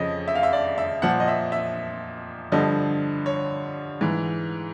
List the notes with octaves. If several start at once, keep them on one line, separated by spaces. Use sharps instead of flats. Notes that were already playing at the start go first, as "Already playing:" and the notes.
Already playing: F2 C#3 F3 D#5
E5
F5
E5
D5
E5
A#2 F3 F#5
D#5
E5
E5
G2 D3 F3 D#5
C#5
G#2 E3